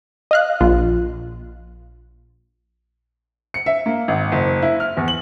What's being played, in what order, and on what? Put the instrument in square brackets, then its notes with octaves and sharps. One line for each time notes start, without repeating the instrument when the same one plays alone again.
[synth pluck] D#5 F5 F#6
A#1 F4
[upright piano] C#7
E5
A#3
G#1
F#1
E4
F6
E2
F#7